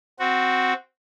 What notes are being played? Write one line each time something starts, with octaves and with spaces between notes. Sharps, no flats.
C4 F#4